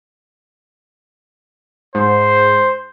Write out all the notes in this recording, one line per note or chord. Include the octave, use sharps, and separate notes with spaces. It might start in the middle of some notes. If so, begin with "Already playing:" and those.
G#2 C5